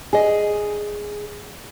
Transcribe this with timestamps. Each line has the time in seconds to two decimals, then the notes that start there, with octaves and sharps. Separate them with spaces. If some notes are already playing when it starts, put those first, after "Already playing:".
0.13 D4 G#4 D#5